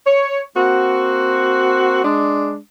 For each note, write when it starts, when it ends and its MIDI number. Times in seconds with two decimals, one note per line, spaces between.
0.07 0.40 73
0.56 2.01 58
0.56 2.01 60
0.56 2.01 66
2.04 2.56 56
2.04 2.56 62